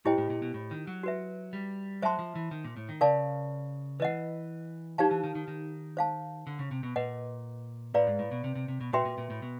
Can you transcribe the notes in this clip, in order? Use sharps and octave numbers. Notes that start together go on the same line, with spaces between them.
A2 E4 G4 C5 D#5 G5
A2
A#2
B2
A2
D#3
F#3
F#4 B4 E5
G3
F#3 C5 E5 A5 C6
F3
E3
D#3
A#2
A2
D#3
C#3 A#4 D5 F5 A5
E3 B4 D#5 F#5
F3 D#4 G4 C5 F5 A5
E3
D#3
D#3
D#3
C5 F5 A5
D3
C#3
C3
B2
A#2 B4 D#5 F#5
A2 B4 D5 F5 A#5
G#2
A2
B2
C3
C3
C3
B2
A#2 F#4 B4 E5 G5 C6
A#2
A#2
A2
B2